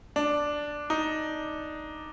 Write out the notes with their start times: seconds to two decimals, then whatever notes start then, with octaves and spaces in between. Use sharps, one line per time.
0.16 D4
0.90 D#4